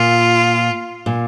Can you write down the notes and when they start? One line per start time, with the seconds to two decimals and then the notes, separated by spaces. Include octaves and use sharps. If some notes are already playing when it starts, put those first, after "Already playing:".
Already playing: A#2 F4
1.06 A#2